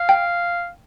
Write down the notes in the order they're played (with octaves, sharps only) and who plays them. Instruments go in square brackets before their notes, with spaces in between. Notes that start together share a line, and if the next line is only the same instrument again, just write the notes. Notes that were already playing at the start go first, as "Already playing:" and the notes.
Already playing: [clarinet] F5
[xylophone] G5